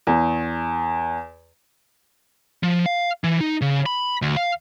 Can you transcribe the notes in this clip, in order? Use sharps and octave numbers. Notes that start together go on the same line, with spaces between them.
E2
F3
F5
E3
D#4
C#3
B5
D2
F5